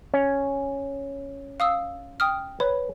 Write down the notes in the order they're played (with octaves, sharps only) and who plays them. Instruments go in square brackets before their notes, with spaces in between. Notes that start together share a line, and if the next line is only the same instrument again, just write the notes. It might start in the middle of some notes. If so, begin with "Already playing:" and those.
[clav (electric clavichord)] C#4
[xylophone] F5 D#6 E6
G5 D#6 F6
[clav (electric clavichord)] B4 [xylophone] C#5